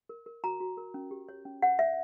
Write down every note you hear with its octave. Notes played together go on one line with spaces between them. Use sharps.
A#4
A#4
F#4 A#5
F#4
A#4
C#4
G4
C#5
C#4
C#5 F#5
C#5 E5